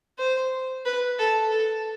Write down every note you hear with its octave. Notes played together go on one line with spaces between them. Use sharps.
C5
B4
A4
A4